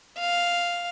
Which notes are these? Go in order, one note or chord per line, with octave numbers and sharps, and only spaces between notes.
F5